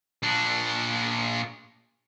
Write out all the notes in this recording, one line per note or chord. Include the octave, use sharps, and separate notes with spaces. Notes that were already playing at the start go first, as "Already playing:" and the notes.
A#2 D4